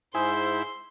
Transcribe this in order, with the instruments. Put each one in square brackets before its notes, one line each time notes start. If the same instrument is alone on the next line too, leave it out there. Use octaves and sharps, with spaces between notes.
[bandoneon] G#2 C5 [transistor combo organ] E4 [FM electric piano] G#4 [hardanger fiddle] C6